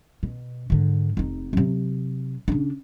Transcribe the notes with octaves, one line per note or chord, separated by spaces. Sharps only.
B2
G#2 D3
F1 D#4
C3 F#3
C#3 D4